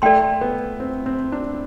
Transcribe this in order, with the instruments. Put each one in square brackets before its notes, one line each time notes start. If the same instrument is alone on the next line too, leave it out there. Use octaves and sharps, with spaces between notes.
[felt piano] A3 [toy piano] A4 D5 G5 C6
[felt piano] B3
C4
C4
D4